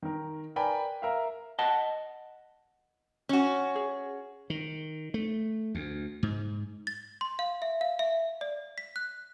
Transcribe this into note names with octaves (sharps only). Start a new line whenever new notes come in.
D#3 A#4
A#4 B4 D5 G5 G#5 B5
A#4 E5 F5
D#5 F#5 A5
C#4 F#4
G#4
D#3
A3
D2
G#2
A6
C6
F5
E5
F5
E5
D5
B6
F#6